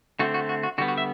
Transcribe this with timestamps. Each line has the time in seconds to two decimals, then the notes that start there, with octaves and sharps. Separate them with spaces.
0.19 D3 A3 C4 F#4
0.34 F#4
0.49 F#4
0.63 F#4
0.78 D3 G3 B3 F#4
0.88 F#4
0.98 E5